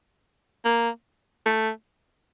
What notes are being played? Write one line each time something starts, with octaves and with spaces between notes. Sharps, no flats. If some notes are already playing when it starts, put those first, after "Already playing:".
A#3
A3